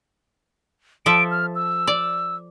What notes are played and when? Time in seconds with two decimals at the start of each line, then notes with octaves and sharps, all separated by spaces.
1.06 F3 A4 E5 D7
1.31 F6
1.55 E6
1.87 D5